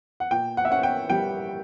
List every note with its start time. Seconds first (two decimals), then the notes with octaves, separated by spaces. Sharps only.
0.20 F#5
0.31 A#2 G5
0.57 F#5
0.65 E5
0.70 C#4 F#5
0.83 G5
1.10 G3 G5